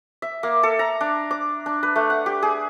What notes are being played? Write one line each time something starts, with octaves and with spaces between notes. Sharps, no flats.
E5
A#3
A4
A#5
D4
D6
D4
B4
A3
F#5
G4
G#4